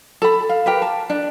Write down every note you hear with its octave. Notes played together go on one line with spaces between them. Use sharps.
A4 B5
F5
G4 A#4 B4
A5
D4